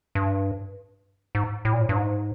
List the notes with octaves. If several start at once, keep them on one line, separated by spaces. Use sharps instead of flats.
G2
G#2
A2
A#2
A2
G2
G#2